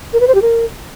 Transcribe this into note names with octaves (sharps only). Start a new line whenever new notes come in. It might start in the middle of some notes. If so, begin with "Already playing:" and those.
A#4
B4
C5
G4
A#4